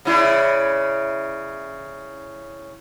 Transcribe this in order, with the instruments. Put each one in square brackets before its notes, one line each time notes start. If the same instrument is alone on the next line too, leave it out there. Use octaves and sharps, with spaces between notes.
[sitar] C#3 E4 D5